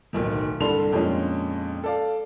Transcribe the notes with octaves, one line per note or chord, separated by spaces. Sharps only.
D1 B1 D#3
C2 G2 D3 A4 C6 F7
F2 A#2 G#3 C#4 D4
A4 D5 F5